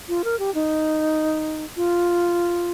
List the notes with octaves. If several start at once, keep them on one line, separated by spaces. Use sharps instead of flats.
F4
A#4
G4
D#4
F4